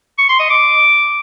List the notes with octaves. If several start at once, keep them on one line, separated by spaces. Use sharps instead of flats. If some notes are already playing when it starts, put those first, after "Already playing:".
C#6
C6
D#5
D6